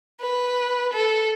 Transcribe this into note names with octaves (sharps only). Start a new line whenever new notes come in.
B4
A4